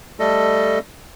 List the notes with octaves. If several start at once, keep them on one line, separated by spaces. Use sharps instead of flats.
G3 A3 A4 D#5